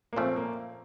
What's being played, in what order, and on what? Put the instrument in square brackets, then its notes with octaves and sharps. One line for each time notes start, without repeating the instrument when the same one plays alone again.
[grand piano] A#3
[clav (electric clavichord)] A#2 F3 A3 C#4 [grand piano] C4
[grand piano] A#3